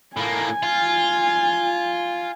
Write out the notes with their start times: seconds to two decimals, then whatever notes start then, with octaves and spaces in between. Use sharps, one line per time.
0.17 A2 A#3 G#5
0.63 F4